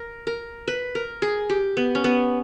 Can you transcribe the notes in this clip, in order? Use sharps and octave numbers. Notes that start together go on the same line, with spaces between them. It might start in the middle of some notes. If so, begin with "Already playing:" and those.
Already playing: A#4
A#4
B4
A#4
G#4
G4
B3
C#4
B3